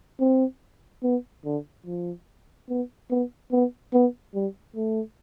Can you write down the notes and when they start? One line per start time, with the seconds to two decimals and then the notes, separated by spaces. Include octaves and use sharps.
0.20 C4
1.03 B3
1.45 D3
1.86 F3
2.69 B3
3.10 B3
3.52 B3
3.93 B3
4.34 G3
4.76 A3